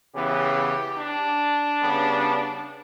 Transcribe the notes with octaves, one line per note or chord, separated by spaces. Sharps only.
C#3 E3 B3 G4
D4
C#3 G3 B3